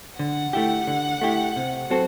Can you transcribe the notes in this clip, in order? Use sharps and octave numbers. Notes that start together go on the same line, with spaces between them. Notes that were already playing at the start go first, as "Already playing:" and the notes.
D3 F#5
A3 E4 G4
D3
A3 E4 G4
C3
F#3 C4 F#4 A4